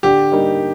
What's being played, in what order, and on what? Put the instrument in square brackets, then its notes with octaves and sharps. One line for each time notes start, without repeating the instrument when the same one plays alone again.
[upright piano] D3 [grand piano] G4
[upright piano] G3 A#3 D#4